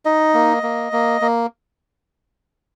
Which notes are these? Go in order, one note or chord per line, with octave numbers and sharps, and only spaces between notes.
D#4 D#5
A#3
A#3
A#3
A#3